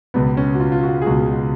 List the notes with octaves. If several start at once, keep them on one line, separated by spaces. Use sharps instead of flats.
C#2 B2 B3
C#4
F#4
F4
F4
F#4
G#4
C#2 B2 F#4